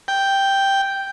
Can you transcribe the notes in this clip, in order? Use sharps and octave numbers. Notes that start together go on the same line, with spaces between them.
G5